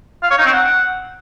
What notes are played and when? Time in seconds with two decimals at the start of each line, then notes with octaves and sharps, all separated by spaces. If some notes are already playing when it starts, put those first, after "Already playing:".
0.23 F5
0.31 C#5
0.38 D#4
0.45 C4
0.53 F#5